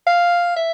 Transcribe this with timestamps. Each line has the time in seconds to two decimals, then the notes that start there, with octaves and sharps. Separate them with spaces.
0.07 F5
0.56 E5